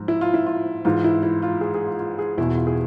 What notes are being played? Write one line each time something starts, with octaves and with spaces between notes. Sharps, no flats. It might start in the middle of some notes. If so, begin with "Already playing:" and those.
Already playing: G#2 F3
E4
F4
E4
F4
G#2 E3 F4
E4
E4
F4
G#4
G#4
F4
F4
G#4
E2 B2 E4
F4
G#4